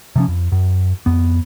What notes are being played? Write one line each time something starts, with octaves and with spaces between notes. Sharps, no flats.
C3 F3 C#4
F2
F#2
F2 B3